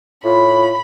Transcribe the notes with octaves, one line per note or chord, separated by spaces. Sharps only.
A2 F4 B5